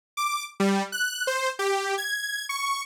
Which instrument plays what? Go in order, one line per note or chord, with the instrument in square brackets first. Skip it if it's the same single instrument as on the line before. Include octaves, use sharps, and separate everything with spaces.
[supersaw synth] D6
G3
F#6
C5
G4
G#6
C#6